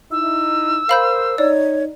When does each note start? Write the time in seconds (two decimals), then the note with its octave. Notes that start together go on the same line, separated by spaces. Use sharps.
0.12 D#4 E4 E6
0.89 A#4 C5 F5 B5 G6
1.38 D#4 C#5 D5